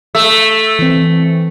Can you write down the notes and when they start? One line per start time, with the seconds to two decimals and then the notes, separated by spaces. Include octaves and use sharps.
0.15 A3 E6
0.79 E3 C4